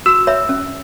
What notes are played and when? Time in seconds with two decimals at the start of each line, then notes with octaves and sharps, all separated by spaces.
0.06 F#4 E6
0.27 C#5 E5 B5
0.49 C#4